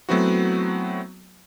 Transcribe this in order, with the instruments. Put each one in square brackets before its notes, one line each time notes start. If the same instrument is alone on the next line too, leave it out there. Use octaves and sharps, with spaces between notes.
[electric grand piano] F#3 A3 B3 C4 E4 F#4